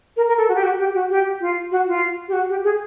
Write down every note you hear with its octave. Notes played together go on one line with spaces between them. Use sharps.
A#4
A#4
A4
F#4
G4
F#4
G4
F#4
G4
F4
F#4
F4
G4
F#4
G4
G#4